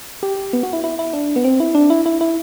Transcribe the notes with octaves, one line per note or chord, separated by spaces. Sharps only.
G4
B3
F#4
E4
E4
E4
D4
B3
C4
E4
D4
E4
E4
E4